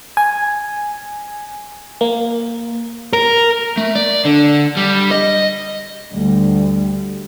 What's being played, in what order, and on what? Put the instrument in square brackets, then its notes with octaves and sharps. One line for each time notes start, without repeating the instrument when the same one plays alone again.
[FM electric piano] G#5
A#3
[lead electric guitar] A#4
[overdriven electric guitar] A3
D5
D3
G3
D#5
[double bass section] D2 G3